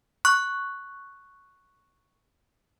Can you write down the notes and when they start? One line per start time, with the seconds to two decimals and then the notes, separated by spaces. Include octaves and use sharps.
0.25 C#6 F#6